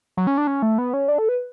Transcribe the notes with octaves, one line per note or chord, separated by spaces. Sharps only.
F#3
C#4
D4
C#4
A3
B3
C#4
D4
A4
B4